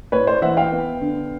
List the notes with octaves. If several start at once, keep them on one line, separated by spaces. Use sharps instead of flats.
A2 B4 C#5
C5 D5
E3 E5 F#5
F5 G5
B3
D3